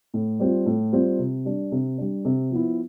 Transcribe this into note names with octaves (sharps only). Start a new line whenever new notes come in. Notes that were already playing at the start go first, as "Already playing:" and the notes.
A2
G3 C4 F4
A2
G3 C4 F4
C3
G3 D4
C3
G3 D4
C3
F3 B3 E4